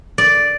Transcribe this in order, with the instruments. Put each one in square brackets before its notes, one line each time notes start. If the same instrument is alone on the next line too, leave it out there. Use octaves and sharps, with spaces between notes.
[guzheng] D5